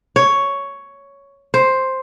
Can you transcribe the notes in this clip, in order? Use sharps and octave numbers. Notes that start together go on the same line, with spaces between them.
C#5
C5